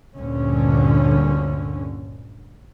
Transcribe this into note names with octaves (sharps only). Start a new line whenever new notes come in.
D2 G2 A#2 D3 C#4